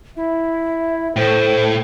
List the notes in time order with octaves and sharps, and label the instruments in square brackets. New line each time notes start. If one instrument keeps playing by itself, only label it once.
[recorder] E4 [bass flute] E5
[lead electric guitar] A2 [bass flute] A4 [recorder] C5